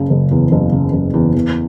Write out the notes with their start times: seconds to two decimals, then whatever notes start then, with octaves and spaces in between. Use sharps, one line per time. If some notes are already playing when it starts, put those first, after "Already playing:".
Already playing: F#1 C#3
0.10 F#1
0.31 E2
0.52 F#1
0.73 C#3
0.93 F#1
1.14 E2
1.35 E2